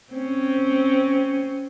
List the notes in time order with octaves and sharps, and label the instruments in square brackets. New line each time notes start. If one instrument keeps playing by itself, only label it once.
[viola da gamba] C4 C#4